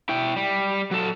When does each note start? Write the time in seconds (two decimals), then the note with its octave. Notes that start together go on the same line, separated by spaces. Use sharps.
0.09 E4 G5
0.36 G3
0.91 F#3 A4